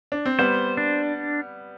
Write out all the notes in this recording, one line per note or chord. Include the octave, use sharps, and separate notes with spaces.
D4
C4
G3 B3 C5
D4